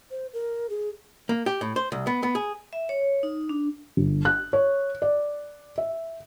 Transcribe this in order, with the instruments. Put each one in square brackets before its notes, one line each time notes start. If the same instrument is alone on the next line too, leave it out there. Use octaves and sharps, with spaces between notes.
[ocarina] C5
A#4
G#4
[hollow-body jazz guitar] A#3
G4
A2
C5
C2
B3
B3
G#4
[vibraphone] E5
C#5
D#4
D4
[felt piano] G1
F#6
C#5
D5
E5